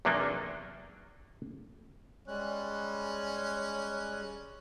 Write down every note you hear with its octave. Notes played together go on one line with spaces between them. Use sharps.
E2 C3 F#3 A#3 D4 D#4
G3 G#3 C#4 F#6